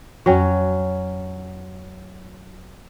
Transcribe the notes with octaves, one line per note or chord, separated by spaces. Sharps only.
F2 F#3 C#4 G5 C#6